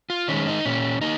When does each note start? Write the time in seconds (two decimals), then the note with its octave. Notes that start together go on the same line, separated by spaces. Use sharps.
0.10 F4
0.28 D#3 G#3 C#4
0.47 D#4
0.66 A#2 C#4
1.01 A#3 D#4